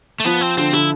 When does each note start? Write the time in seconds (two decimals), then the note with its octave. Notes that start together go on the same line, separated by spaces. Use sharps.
0.20 A3
0.25 F3 B3
0.41 C4
0.57 D3 C4
0.73 D3 E4